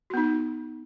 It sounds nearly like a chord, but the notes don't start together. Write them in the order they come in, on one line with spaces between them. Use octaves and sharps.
F#4 B3 D#4